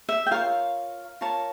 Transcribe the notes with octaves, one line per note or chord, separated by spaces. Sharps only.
E5
G5
F4 A#4 C#5 F5
F4 A#4 C#5 A5